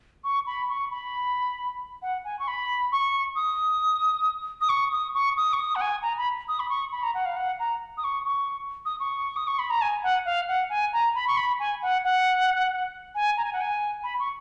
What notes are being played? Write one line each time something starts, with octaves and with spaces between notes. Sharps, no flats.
C#6
B5
C#6
B5
F#5
G#5
C#6
B5
C#6
D#6
D#6
C#6
D#6
C#6
D#6
C#6
D#6
F#5
G#5
A#5
B5
D#6
B5
C#6
B5
A#5
F#5
F5
F#5
A#5
D#6
C#6
C#6
D#6
C#6
D#6
C#6
B5
A#5
G#5
F#5
F5
F#5
G#5
A#5
B5
C#6
B5
G#5
F#5
F#5
G#5
A#5
G#5
F#5
G#5
B5
C#6